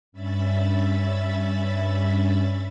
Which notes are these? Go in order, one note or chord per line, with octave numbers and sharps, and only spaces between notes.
G2 C#4 E5 B5 A6